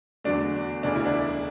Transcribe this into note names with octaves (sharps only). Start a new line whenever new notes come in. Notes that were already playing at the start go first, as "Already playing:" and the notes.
E2 D3 F#3 A3 D4
E1 D2 C#3 E3 D4
E4
D4